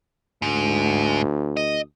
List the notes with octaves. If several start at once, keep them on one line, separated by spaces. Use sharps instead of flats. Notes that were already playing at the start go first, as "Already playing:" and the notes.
D2 G#2
D#5